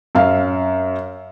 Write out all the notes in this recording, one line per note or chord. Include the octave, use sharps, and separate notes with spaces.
F#2 F5